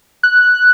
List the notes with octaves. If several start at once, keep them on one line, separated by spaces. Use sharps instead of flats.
F#6